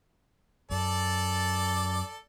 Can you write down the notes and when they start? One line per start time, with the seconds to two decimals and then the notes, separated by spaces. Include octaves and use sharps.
0.71 F#2 A4 D5